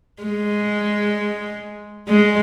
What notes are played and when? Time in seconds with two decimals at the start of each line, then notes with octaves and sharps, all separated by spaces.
0.23 G#3
2.08 G#3